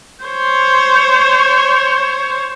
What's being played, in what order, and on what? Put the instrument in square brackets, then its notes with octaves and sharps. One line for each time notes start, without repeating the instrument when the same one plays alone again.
[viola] C5 C#5